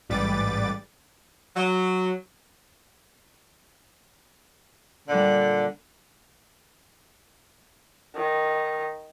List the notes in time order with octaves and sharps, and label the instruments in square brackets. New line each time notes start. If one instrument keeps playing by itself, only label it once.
[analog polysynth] A1 G#2 G3 B4 D6 A6
[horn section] F#3
[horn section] A#2 D3 [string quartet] G3 F#6
[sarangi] D#3